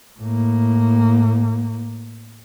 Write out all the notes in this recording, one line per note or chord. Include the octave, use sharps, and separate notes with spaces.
A2 A#3